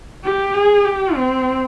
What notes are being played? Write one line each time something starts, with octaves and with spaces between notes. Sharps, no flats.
G4
G#4
G4
C4